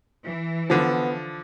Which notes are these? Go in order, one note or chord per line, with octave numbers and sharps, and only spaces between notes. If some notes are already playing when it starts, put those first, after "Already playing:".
E3
D3 F3 B3